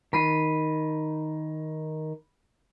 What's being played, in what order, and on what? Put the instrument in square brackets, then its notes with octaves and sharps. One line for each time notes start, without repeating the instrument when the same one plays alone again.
[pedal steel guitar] D#3 [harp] B5 C7 D#7